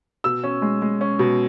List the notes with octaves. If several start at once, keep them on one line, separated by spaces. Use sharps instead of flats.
B2 E6
C#4
G#3
G#3
C#4
B2